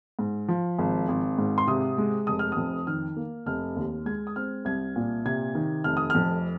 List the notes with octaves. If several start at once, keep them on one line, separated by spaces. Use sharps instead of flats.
G#2
F3
G#1
G#1
G#2
C6
C3 D#6
G#3
F1 D#6
F6
F2 D#6
D#3 F6
A#3
F1 F6
D#2
G#3 G#6
D#6
C4 F6
C2 G#6
A#2
C3 G#6
D#3
F1 F6
D#6
F2 F6